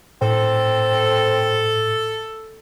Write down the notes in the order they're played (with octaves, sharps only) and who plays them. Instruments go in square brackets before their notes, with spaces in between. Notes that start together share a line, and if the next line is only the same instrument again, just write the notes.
[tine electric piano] A2 [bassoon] C4 [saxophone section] A4